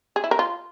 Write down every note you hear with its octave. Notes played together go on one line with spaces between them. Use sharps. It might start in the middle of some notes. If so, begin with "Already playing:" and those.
G#4
E4
A#4
F4